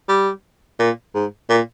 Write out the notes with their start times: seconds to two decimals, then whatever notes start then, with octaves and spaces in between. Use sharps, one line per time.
0.08 G3
0.79 A#2
1.15 G#2
1.49 A#2